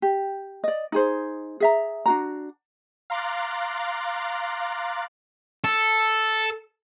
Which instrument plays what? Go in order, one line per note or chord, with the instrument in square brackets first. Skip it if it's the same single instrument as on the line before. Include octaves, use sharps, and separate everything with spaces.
[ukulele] G4
D5 D#5
D#4 G#4 C5
G#4 E5 A#5
D4 F#4 A#5
[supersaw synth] F5 A#5 C6 D6 F#6 A6
[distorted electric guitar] A4